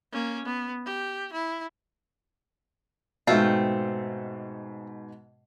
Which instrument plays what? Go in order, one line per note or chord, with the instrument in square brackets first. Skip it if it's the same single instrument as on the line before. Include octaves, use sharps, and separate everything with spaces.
[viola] A#3 C#4
B3
G4
E4
[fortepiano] G#2 B2 [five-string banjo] A3 C4 F4